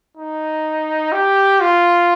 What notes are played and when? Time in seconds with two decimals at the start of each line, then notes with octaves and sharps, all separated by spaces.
0.17 D#4
1.12 G4
1.60 F4